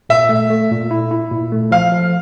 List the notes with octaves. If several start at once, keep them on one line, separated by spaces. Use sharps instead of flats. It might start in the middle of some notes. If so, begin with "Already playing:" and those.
A#2 E5
A3
A3
A#2
E4
E4
A#2
A3
F3 F5
F3